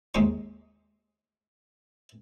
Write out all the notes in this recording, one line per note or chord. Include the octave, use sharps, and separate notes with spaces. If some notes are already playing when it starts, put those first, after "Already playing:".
D#2 G#3 C4 D#4 C#6